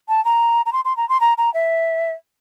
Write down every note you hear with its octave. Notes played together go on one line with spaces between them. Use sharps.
A5
A#5
A#5
C6
C6
A#5
C6
A#5
A#5
E5